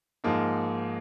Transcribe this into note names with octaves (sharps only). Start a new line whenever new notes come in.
G#2 F3 A#3 D#4